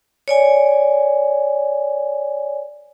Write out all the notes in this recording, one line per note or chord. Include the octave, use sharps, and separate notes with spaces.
C#5 D5 G#5